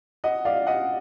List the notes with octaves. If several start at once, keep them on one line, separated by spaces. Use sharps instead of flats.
D#5 F#5
D5 F5
D#5 F#5